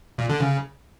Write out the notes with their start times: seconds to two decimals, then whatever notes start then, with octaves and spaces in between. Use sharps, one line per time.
0.18 A#2
0.29 D3
0.40 C#3